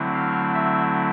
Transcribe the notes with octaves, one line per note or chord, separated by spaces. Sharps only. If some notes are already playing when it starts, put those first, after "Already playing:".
Already playing: D3 F#3 A3 C4 E4
F5
E5